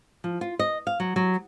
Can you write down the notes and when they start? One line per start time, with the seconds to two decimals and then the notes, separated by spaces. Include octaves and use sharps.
0.24 F3
0.41 F4
0.59 D#5
0.87 F5
1.00 F#3
1.16 F#3